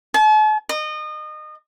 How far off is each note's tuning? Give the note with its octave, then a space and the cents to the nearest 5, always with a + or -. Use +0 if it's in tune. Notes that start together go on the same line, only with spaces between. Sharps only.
A5 -45
D#5 -30